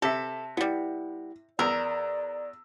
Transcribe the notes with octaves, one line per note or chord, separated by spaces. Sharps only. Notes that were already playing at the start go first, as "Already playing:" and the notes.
C3 A4 E5
G3 B3 E4
E2 A#4 D5 E6